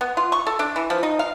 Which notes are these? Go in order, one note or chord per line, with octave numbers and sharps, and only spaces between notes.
B3
F4
C#6
A4
D4
E3
F3
D#4
F5